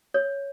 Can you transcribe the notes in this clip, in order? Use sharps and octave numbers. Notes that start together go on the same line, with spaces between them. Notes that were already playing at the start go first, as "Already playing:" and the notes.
C#5